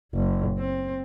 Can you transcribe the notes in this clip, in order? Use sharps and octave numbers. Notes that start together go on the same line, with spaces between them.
F#1
C4